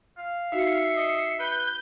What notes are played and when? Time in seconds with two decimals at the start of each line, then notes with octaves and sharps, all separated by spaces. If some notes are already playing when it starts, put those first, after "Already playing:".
0.18 F5
0.52 D#4 F#4 E5 C7 C#7
0.96 D#5
1.39 B4 G6